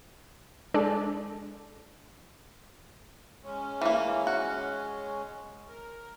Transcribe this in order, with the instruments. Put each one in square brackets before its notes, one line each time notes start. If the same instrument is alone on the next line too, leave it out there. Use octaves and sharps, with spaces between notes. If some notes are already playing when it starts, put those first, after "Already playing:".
[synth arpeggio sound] G#3 D4 G#4 A4 D5
[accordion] G#3 C#4
[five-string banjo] E3 A#3
F#4
[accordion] A#4